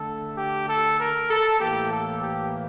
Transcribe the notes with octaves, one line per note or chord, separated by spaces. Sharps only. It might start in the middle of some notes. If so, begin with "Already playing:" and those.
Already playing: D3 A3 A4
G4
A4
A#4
A4
A2 E3 A#3 G4
A4
G4